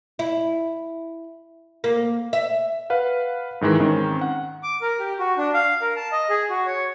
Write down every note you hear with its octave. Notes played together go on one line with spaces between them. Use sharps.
E4
A#3
E5
B4 F5 F#5
G#2 D#3 E3 G#3
G#2 D#3 C4 C#4
F#5
D6
A#4
G4
F#4
D4
F5
A#4
A5
D#5
G#4
F#4
C#5